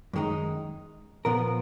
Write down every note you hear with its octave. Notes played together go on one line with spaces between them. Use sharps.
F#2 D#3 G#3 D#4
A#2 F3 B3 F4 A#4